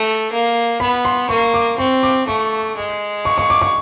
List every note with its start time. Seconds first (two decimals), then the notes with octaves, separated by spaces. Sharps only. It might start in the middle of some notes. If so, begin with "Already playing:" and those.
Already playing: A3
0.32 A#3
0.80 B3 B5
1.05 C6
1.29 A#3 C#6
1.54 D6
1.78 C4 C#6
2.03 D6
2.27 A3 C#6
2.76 G#3
3.25 C#6
3.38 C#6
3.50 D6
3.61 C#6